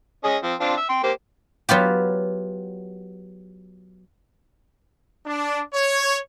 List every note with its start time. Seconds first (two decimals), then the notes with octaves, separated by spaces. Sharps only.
0.24 C#4 G#4 D#5
0.43 F3 C4
0.60 C4 D4 F4
0.77 E5
0.89 G5 C6
1.03 A#3 G4 C5
1.69 F#3 B3 F4 G4
5.24 D4
5.73 C#5